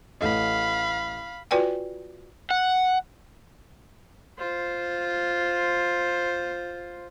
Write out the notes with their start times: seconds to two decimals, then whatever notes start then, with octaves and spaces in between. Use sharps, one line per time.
0.21 A1 A4 D#5 F5 B5
1.51 F4 F#4 B4 D5 G5 G#5
2.51 F#5
4.38 F4 C5